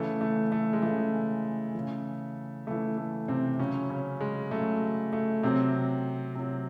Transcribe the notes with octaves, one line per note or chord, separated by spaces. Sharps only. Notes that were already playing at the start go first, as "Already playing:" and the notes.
Already playing: C#3 E3 A3
A3
A3
G#3
C#3 E3 A3
C#3 E3
C#3 E3 A3
A3
C3 C4
C#3 F#3 C#4
C#3 C#4
G#3
C#3 F#3 A3
A3
C3 F#3 C4
C3 F#3